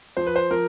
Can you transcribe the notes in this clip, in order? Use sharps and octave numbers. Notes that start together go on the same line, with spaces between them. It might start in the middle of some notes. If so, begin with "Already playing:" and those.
F3 C5
B4
C5
F3 A#4